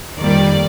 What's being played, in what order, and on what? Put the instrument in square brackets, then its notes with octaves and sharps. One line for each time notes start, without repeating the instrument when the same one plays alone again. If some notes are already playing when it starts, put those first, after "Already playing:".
[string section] F2 D#3 G3 A#3 D5